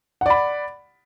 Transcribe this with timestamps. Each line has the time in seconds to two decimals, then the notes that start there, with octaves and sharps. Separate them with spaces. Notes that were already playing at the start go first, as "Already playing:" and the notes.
0.21 F#5
0.26 D5
0.30 B5